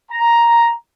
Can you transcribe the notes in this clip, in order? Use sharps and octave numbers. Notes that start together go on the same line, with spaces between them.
A#5